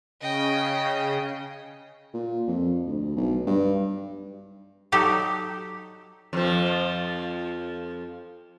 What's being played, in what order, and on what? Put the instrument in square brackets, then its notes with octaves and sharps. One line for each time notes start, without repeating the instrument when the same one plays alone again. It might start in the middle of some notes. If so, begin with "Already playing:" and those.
[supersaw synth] C#3 [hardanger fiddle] D#5 G5
[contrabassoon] A#2
F2
D2
B1
G2
[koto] F#3 D#4 G4 A4 D5
[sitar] F2 F3